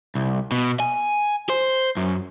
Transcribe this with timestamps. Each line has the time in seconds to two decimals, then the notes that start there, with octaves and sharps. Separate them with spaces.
0.15 C2
0.52 B2
0.80 G#5
1.50 C5
1.97 F#2